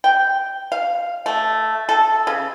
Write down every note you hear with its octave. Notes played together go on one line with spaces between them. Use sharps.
G5
F5
A3
A4
C#3